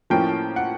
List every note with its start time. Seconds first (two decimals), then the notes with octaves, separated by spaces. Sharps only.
0.10 A2 F3 A#3 C#4 G5
0.56 F#5